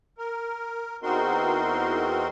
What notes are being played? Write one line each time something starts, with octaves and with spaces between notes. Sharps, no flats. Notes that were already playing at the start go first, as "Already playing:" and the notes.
A#4
E2 C4 D#4 F#4 A#4 C6